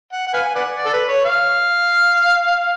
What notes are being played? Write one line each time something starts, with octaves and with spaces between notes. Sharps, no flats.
F#5
F#5
B4 F5 G#5
B4 D5 F#5
D5
A4
B4
C#5
F5